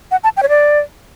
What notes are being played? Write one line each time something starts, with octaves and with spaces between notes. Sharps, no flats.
F#5
A5
G5
C#5
D5